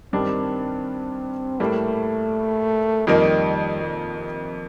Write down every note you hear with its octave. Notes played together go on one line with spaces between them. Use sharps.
G2 D#3 G3 C4 D4
A2 G3 A3 A#3
F2 D#3 G3 A#3 D#4
A#2
C3